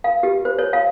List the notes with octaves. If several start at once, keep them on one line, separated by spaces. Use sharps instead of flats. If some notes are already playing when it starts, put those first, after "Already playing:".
F5
G4
C5
C#5
F5